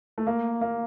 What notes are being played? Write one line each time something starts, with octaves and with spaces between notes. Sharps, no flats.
A3
A#3
A#3